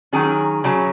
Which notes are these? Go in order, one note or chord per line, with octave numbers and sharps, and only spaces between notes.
D#3 F#3 C#4 G#4
C#3 F#3 C#4